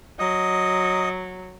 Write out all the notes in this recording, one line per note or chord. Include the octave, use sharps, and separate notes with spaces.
F#3 D#5